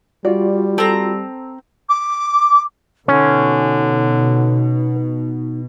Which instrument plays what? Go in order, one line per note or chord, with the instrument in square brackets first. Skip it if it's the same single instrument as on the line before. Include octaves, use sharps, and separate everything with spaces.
[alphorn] G3 [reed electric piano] F4 F#4 [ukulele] D5
[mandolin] C4 A#5 [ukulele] A4
[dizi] D6
[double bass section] B2 [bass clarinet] D3 [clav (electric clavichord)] C#4 [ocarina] D#4